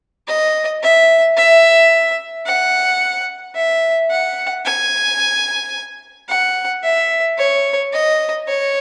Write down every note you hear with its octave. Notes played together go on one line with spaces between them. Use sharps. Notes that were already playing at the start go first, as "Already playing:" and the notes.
D#5
E5
E5
F#5
E5
F#5
G#5
F#5
E5
C#5
D#5
C#5